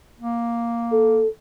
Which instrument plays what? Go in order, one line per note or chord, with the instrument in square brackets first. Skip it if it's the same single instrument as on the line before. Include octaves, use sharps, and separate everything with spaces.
[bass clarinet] A#3
[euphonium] A4